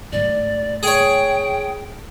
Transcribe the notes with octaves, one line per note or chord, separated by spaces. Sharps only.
G#2 A3 D5
G#4 C#5 G5